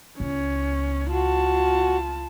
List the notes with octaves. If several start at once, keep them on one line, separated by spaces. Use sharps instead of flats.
C#2 C#4
F4 F#4 A5